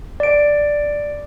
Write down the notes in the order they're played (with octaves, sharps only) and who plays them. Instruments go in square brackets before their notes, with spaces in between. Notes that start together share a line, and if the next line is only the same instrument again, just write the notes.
[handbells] D5 D7